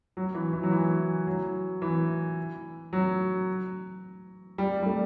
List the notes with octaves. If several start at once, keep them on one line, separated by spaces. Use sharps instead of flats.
F#3
E3
E3
F#3
E3
F#3
E3
F#3
G3
G3
A3